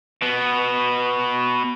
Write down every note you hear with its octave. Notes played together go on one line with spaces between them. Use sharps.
B2 B3